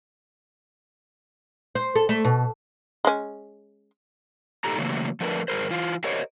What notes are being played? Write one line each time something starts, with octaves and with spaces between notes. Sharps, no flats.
C5
A4
A3
B2
G#3 C#4
A#2 D#4 G4 A4 A#5
C#3 E3 F#3 A3 A#3
F3 A3 D4 A#4 B4
G2 G#4 A#4 C5
E3 F4
G4 A#4 C5 C#5 D#5